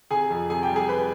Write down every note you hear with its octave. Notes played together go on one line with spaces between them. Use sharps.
C3 G#4 G#5
F2
C3 G#4 G#5
G4 G5
G3
G#4 G#5
G3 B4 B5